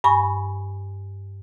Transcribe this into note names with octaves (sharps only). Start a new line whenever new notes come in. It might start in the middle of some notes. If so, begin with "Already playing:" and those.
G2 G#5 B5 C#6